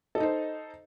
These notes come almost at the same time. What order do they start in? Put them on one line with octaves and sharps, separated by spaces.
A4 D#5 D#4 C5